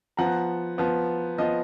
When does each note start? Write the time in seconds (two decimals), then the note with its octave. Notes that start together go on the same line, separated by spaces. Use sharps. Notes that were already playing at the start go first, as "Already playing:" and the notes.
0.17 F3 B3 F#5 A#5
0.78 F3 B3
1.38 F3 B3 D#5